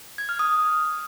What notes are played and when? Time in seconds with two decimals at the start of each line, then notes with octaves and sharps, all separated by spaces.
0.18 G#6
0.29 F6
0.39 D#6